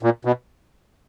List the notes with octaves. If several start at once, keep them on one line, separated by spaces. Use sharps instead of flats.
A#2
B2